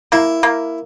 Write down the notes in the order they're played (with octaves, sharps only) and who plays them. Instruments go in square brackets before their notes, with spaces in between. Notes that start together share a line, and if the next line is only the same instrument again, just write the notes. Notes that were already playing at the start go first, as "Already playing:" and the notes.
[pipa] A#3 [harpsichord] E4
[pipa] A#3